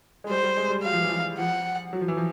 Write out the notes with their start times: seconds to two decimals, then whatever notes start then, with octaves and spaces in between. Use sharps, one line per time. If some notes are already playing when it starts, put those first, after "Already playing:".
0.24 G#3
0.29 G3 C5
0.43 G3
0.57 G#3
0.70 G3
0.84 F#3 F5
0.93 F3
1.01 E3
1.08 F3
1.38 F3 F#5
1.93 F#3
2.01 F3
2.08 E3
2.17 F3